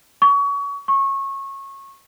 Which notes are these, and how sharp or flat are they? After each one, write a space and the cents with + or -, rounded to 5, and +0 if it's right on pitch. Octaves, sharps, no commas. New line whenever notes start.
C#6 +30
C#6 -25